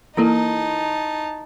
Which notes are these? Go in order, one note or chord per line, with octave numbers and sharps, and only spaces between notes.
E3 A#3 D#4 E4 A4 A#4 A5